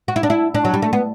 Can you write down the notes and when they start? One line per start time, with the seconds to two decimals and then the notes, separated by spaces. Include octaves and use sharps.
0.08 F#4
0.16 E4
0.23 D4
0.30 E4
0.55 D4
0.65 F#3
0.74 G3
0.82 A3
0.93 B3